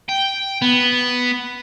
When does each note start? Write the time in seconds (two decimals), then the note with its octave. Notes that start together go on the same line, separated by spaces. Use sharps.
0.09 G5
0.62 B3